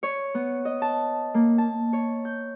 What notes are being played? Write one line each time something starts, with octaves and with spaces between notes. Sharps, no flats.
C#5
B3
D#5
A5
A#3
A5
C#5
G6